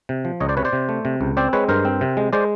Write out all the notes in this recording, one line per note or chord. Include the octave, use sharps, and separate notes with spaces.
C3
F3
C#2 C#5 D#5
C5 D5
C3 B4 C#5
C5 D5
C3
A3
C3
C#2
C4 C5 D5
G#3 B4 C#5
G2 A#4 C5
C4
C3
G#3
G#3 C5 D5